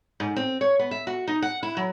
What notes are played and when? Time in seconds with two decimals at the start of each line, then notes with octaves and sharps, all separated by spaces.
0.20 G#2
0.36 C4
0.61 C#5
0.79 B3
0.91 E5
1.07 F#4
1.27 D#4
1.42 F#5
1.63 E4
1.77 F#3